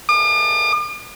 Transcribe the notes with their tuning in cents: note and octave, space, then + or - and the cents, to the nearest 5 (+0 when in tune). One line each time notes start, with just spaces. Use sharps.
D6 +45